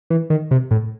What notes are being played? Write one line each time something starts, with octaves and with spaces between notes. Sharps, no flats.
E3
D#3
C3
A2